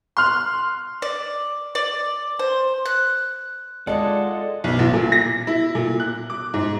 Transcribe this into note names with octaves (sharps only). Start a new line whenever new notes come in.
C6 F6 F#6
D5
D5
C5
F#6
G#3 D4 F4 G#4 A4 D5 D#5 F#5
B1
A1
A#2
A#6
E4
A#2
F#6
D6
G#2